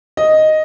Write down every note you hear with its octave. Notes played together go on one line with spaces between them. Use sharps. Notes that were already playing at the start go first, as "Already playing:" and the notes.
D#5